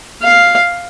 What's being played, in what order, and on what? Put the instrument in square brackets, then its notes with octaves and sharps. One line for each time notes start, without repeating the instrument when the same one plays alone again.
[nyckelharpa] F5